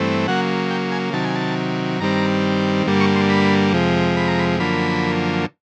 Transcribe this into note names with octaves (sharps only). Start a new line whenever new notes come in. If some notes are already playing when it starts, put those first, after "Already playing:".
Already playing: G2 E3 A3 C4
C#3 F#3 A#3 F#5
G5
G#5
C3 D#3 F#3 A5
G#5
A5
G2 D#3 G3 C4 A#5
G2 D3 G3 A#3
C#6
C6
B5
F2 C3 F3 G#3
B5
A#5
B5
F#2 D3 F3 A#3 B5